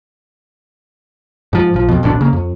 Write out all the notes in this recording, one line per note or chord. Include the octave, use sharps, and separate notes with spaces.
G#2 F3
A#1 F3
F2 B2
D1 A1 B2 D4
C#3 A#3
F2